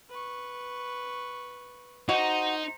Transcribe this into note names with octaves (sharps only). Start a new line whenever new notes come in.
B4 C#6
D#4 F#4 C5 A#5